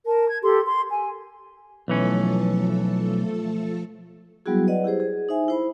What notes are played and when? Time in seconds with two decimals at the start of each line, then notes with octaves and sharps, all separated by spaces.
0.06 A#4 A5
0.27 G#6
0.43 G4 A4 C6
0.65 C6
0.91 G#5
1.88 B1 E3 F3 A3 C#4 A4
4.46 F#3 G3 B3 E4 F#4 G#4
4.67 B4 D5 D#5 F#5
4.84 E4 G4 G#4 C5
5.00 G#4
5.29 D#4 C5 E5 G#5
5.48 E4 C5 B5